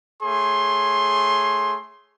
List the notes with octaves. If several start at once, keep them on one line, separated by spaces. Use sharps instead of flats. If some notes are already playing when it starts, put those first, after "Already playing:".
A3 G#4 C#5 C6